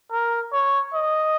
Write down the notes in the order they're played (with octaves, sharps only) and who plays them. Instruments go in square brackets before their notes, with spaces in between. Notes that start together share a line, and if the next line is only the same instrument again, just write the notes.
[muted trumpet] A#4
C#5
D#5